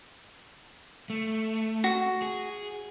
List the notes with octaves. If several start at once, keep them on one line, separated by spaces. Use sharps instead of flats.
A3
F#4
G#4